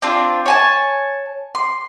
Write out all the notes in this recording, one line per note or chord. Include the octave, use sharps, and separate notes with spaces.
C4 D4 F4
C#5 G#5 A5
C6